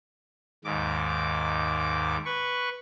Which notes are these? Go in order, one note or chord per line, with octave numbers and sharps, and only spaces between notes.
D#2 G#2 D6
B4 C#6